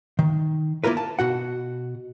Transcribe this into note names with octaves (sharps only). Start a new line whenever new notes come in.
D#3
A#3 E4 F4 A#4 B4
A5
B2 F#4 F#5